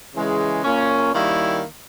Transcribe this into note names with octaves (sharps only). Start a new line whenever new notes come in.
C#3 E3 G#3
A#2 A#3 C#4
D#3 G3 A#3 C#4 E4